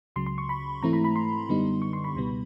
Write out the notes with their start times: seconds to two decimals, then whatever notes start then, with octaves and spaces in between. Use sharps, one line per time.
0.16 C#2 C#3 F#3 C6
0.26 C6
0.38 C#6
0.49 B5
0.82 G#2 E3 A3 C4 E4 A#5
0.93 B5
1.04 B5
1.16 C6
1.49 F#2 D3 G3 B3 D#4
1.82 C#6
1.93 C6
2.04 B5
2.15 C#2 B2 G3 B3